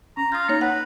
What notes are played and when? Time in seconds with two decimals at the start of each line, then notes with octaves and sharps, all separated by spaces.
0.17 C#4 A#5
0.32 F4 D#6 G6
0.49 A#3 D#4 C#5 A#5
0.61 B4 F#5